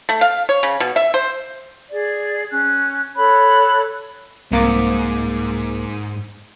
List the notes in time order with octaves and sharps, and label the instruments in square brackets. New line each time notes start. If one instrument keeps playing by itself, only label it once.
[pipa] A3
F5
C#5
C#3
B2
E5
C5
[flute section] G#4 D5
C#4 F#6
A4 C#5 B5 F#6
[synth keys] C2 A#3 D6 [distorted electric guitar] G#2